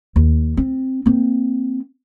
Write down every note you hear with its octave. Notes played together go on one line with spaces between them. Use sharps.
D#2
C4
A#3 C4